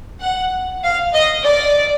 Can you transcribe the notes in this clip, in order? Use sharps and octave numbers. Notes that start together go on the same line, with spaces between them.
F#5
F5
D#5
D5